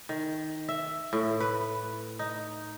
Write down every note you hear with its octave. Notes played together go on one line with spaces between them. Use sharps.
D#3
E5
A2
B4
D#4